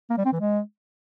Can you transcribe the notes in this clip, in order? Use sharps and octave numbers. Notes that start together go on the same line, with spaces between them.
A#3
G3
C4
E3
G#3